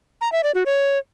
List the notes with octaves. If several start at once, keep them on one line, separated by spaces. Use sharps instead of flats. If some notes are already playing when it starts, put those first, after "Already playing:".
A#5
E5
D5
F#4
C#5